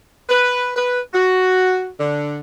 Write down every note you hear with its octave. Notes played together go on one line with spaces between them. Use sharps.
B4
B4
F#4
D3